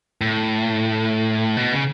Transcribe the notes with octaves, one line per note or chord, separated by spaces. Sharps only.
A2
B2
C#3